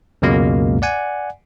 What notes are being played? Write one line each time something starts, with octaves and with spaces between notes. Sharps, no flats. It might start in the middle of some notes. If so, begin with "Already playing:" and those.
C#2 F#2 B2 G#3 A#3
D5 F#5 G#5